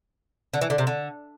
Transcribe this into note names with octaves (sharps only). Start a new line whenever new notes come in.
D3
E3
D3
C3
D3